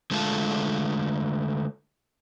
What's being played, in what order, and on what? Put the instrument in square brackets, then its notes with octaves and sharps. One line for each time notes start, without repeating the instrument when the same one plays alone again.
[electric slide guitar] D3 G#3 A3 F4 A5